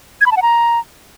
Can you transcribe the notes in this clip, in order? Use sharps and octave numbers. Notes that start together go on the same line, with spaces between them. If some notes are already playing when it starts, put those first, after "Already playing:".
G#6
B5
A5
F#5
A#5